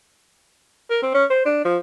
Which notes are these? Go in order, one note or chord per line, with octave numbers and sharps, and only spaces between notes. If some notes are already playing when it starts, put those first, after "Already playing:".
A#4
C4
C#4
C5
D4
F3